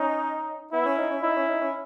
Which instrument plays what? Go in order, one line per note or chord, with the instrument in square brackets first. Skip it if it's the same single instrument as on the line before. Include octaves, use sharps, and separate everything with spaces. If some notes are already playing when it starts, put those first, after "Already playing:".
Already playing: [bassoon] C#4 [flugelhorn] D#4
[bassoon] B3 [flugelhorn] E4
[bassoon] C#4
D#4
C#4
[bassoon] D#4 [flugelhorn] E4
[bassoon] C#4
D#4
C#4